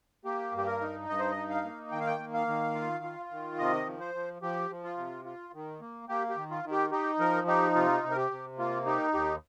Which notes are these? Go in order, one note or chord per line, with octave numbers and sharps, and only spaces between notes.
A#3 G4
G2 G4
A#4
D#4
G2 D#5
C5
D#5
D#4
F5
A#3
D#3 G5
F5
G5
A#3
F5
D#3
F4
F4
D#3
C3 D#5
F3
C5
F3
F3 G4
F3
F4
C3
F4
D#3
A#3
A#3 G4
G4
D#3
F4
D#3
G4
D#4 G4
F3 A#4
D#4 G4
C3 F4
C3
A#4
G4
C3
A#3 F4
D#4 G4
D#2 G4